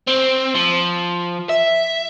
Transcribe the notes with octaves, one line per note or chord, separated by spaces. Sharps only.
C4
F3
E5